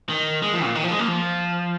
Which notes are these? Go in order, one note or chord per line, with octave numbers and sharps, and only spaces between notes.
D#3
G#3
F3
A#2
D#3
F3
G#3
A#3
F3